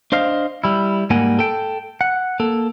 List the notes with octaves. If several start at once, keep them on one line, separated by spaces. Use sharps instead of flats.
D4 C5 D#5 F5
G3 E4
G#2 G3 A#3 F#5 G#5
A4 G5
F#5
A#3 A4